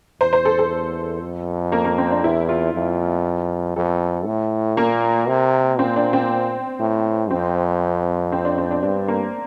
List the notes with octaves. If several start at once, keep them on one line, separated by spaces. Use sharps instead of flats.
E2 C5
C5
A4
A4
F2
A#3
A#3
C4
D4
E2 E4
F4
F2
F2 A4
A2
A#2 A#3
C3
A#2 C4
D4
C4
A2
F2 C4
C4
D4
C4
D4
G2 D4
A#3